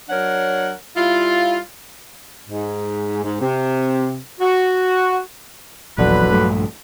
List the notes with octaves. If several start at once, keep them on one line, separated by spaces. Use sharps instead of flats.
F#3 D4 A#4 C#5 F#5
G3 E4 F4
G#2
G#2
C3
F#4
D#1 A#1 E2 D3 F#3 B4
A#1 G2 A3